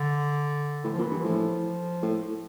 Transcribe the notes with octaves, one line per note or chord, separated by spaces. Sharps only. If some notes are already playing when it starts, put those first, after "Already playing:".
Already playing: D3
A2 E3
F3
A#2
E3
G2
A2 F3
A2